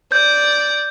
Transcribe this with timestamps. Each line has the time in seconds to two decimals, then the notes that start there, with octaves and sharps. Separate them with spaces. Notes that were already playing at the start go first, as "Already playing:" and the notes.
0.12 D5 G6